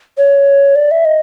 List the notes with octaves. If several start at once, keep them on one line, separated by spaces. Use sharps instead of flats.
C#5
D5
E5
D#5